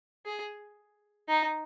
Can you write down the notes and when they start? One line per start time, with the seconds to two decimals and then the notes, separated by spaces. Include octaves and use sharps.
0.26 G#4
1.29 D#4